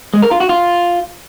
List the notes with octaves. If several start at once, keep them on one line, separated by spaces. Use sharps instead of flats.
G#3
A#4
F4
F#4
F4